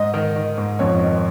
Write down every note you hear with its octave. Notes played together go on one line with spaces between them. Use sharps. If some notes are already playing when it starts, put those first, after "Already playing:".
Already playing: G#2 D#5
D#3
D#3
G#2
F2 C#5
D#3